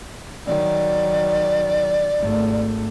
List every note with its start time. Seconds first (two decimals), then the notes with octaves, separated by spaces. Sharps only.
0.46 D#3 F#3 D5
2.18 G#1 A3